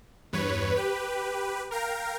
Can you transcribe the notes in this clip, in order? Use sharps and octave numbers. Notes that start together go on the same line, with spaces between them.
E2 G2 B4 C#5
G4 B4
A#4 F5 G5 A#5